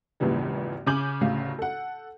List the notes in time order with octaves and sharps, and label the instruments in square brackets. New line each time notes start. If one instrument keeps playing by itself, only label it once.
[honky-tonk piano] G#1 D#2 A#2 C#3 E3 G3
C#3 C#4 G#5 D6 G6 F#7
A1 D2 C#3 F5
A4 F#5